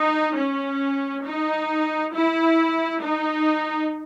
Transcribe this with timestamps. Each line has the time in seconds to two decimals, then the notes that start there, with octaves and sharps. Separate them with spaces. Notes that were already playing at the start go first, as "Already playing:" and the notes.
Already playing: D#4
0.36 C#4
1.24 D#4
2.13 E4
3.01 D#4